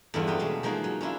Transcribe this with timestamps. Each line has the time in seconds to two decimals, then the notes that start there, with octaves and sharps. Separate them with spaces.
0.14 E2 G2 D3 A3 B3 F4
0.27 F#3 C#4 G4 B4
0.39 B2 G#3 A3
0.63 F3 G#3 A#3 D#4 F#4
0.84 F#3
1.01 C#4 D4 E4 F4